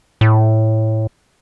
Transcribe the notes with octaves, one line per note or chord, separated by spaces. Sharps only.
A2